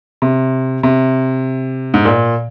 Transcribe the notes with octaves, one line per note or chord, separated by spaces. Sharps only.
C3
C3
G#2
A#2